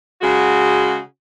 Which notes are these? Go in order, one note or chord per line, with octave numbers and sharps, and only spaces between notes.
C#3 G#3 F#4